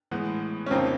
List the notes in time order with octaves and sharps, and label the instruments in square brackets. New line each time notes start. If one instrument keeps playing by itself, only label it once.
[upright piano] A2 E3 G#3 B3
[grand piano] C#4
[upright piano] F2 C#3 F3 A#3 D#4 [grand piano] C4